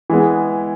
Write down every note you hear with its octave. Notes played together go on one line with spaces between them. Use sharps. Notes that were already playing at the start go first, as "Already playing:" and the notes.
E3 G#3 B3